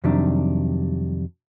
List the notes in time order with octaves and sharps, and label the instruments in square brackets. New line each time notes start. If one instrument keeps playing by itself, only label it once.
[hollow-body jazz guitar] F2 C3 D#3 F#3 G3 D4